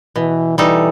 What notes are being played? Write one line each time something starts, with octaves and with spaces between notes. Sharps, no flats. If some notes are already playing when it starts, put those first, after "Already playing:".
B2 E3
E3 G3 D#4 A4